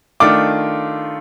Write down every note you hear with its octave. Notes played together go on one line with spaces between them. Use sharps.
D#3 A3 D4 F4 D6